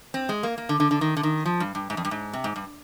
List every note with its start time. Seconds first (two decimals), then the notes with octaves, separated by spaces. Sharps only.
0.14 C4
0.29 G#3
0.43 A#3
0.58 A#3
0.69 D3
0.80 D3
0.91 D3
1.01 D#3
1.17 D3
1.23 D#3
1.45 F3
1.60 G2
1.75 G2
1.90 G#2
1.97 F2
2.05 G2
2.11 G#2
2.33 C3
2.44 G#2
2.56 G2